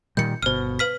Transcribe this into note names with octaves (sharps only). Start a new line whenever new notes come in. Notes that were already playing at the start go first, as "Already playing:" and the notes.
A#2 D#3 G3 G6 C#7
G1 B2 C5 F6
B4 F6 B6